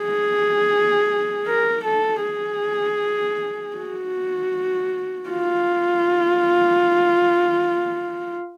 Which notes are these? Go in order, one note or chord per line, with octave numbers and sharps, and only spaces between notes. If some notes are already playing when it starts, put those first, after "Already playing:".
Already playing: G#4
A#4
A4
G#4
F#4
F4